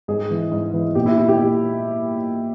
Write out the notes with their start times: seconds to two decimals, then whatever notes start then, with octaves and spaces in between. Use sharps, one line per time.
0.08 G#2 G#4
0.31 E3
0.52 G#2
0.74 E3
0.95 A#2 G4
1.06 E4
1.18 E4
1.29 G4
1.38 A#2